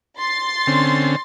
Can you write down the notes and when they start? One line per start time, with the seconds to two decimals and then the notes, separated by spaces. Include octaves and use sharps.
0.18 C6 A6
0.67 D3 C4 C#4